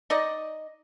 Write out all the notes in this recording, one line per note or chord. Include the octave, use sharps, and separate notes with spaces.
D#4 D5 D#5